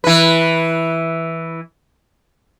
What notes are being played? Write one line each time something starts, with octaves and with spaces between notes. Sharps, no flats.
E3 B4